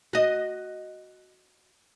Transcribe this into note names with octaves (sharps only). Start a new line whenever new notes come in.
F#4 D#5